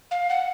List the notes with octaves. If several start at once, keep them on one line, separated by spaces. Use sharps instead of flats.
F5
F#5